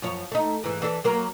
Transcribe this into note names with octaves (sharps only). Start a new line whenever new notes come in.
F#2 F3 C#5
A3 D#4
G#2 E3
E3 D4 A4
F#3 A#3 A#4